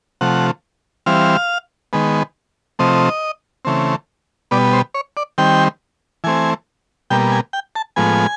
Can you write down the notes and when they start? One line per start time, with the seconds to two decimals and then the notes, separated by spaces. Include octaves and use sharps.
0.21 C3 F3 A3 F#5
1.06 E3 G3 C4 F5
1.93 D#3 G#3 B3
2.79 C3 F3 A3 C4 D#5
3.65 C#3 E3 A3 C4
4.51 B2 G3 B3 D5
4.73 C5
4.94 C#5
5.17 D5
5.38 D#3 G3 C4 G5
6.24 E3 A3 C4 G#5
7.10 B2 G3 A#3 G5
7.32 G#5
7.53 G5
7.76 A5
7.96 A2 F3 G#3 B3 G#5